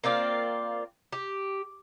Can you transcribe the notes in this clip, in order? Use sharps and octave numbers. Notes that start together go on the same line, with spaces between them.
A#3 C4 F4 D5
G4